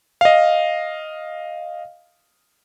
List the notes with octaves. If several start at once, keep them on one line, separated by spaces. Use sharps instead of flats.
D#5 F5